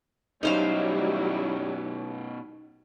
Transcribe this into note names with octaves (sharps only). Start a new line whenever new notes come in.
B2 F#3 G3 C#4 D#4 E4 C5 F5